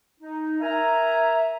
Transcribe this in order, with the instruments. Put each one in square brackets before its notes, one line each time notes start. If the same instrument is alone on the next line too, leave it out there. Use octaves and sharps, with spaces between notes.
[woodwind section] D#4
[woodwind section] A#4 G#5 A#5 [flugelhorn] E5